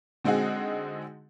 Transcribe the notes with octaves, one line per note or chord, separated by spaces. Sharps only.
D3 G#3 C4 D#4 F#4 G#4